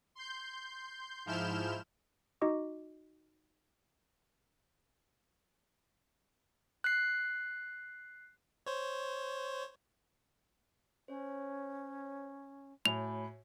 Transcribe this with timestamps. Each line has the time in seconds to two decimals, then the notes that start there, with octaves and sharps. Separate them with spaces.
0.15 C6 G6
1.26 G#2 F3 E4 F6 G6 E7
2.41 D#4 F#4 D#5 C#6 D6
6.84 F#6 C7
8.66 C5 C#5
11.08 C#4 C5 C#5
12.86 A2 F#4 C#5 G#5 B5 F7